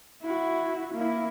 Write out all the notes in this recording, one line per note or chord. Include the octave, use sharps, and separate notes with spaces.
E4 F#4
A#3 E4